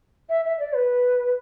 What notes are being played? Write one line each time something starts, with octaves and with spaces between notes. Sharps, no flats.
E5
E5
D5
B4